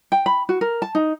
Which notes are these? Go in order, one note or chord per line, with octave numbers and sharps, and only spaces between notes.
G5
B5
F#4
A#4
A5
D#4